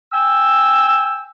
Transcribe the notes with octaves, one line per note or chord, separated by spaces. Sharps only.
G5 G#5 E6